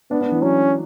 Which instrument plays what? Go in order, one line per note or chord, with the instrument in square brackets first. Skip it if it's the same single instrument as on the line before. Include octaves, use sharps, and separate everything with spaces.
[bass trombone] B3 [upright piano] D4
[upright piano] D4
E3
[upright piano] F#3 [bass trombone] C#4